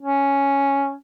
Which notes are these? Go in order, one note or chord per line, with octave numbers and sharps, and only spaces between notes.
C#4